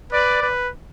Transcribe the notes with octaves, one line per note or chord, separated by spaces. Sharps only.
B4 D5
B4